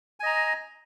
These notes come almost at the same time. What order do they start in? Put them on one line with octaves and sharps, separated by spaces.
G#5 D#5 A#5